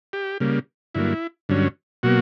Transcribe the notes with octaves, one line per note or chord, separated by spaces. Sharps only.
G4
C#3 G3 A#3
G2 D3 F#3 A#3 E4
G2 D3 F#3 C#4
B2 F#3 A#3 F#4